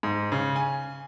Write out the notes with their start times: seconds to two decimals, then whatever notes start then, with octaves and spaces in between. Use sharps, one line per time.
0.03 G#2
0.32 C#3
0.56 G#5